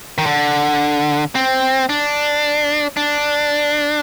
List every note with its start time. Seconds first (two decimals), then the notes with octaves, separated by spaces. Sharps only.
0.18 D#3
0.26 D3
1.35 C4
1.89 D4
2.97 D4